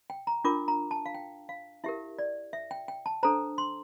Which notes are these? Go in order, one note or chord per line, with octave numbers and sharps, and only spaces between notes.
G5
A#5
D4 F4 A#4 D6
A#5
A5
F5
G5
F5
E4 G4 A#4 E5
D5
E5
G5
G5
A5
D4 A4 C5 A#5
C6